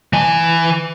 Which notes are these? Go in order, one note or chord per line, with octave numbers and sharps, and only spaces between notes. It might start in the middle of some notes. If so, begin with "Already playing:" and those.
E3 G#5